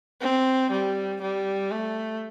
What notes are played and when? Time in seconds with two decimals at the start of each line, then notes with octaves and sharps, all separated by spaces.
0.21 C4
0.71 G3
1.21 G3
1.71 A3